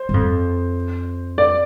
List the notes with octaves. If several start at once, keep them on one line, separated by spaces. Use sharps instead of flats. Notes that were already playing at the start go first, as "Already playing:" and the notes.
Already playing: C5
G2
F2
D5